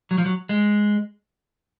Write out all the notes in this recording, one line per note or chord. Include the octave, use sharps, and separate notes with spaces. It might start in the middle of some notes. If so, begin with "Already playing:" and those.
F#3
F3
F#3
G#3